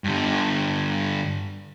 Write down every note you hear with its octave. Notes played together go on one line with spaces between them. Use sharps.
G2 D3